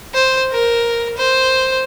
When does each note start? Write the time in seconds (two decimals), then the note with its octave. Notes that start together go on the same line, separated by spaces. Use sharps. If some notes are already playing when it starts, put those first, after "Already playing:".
0.14 C5
0.52 A#4
1.17 C5